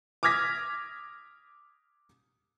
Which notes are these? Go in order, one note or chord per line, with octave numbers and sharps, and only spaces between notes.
D6 D#6 F6 G#6 A#6 B6